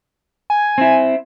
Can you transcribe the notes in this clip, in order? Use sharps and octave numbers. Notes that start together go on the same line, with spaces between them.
G#5
C4 E4